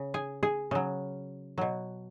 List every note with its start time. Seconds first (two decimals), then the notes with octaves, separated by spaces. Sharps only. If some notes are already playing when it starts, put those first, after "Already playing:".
Already playing: C#3
0.14 G#4
0.43 G#4
0.71 C#3 F#3
1.58 B2 F#3